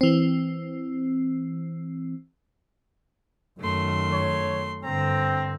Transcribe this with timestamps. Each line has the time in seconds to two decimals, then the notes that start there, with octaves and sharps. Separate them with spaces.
0.01 E3 C4
3.60 F#2 D#3 A3 C6
4.12 C#5
4.84 G2 D3 C4 A#5